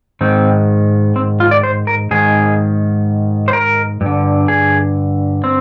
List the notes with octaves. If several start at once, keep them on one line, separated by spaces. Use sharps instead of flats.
G#2 D#3 C4
C4
F4
D5
C5
A#4
G#2 D#3 G#4
C5
A#4
G2
D3
G#4
C4